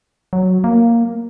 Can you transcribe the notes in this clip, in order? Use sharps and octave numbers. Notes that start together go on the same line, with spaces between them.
F#3
A#3